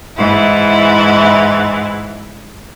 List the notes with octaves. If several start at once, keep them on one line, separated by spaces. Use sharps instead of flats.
G#2 E3 E4